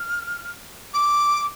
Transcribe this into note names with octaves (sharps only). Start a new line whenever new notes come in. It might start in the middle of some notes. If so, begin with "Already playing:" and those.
Already playing: F6
D6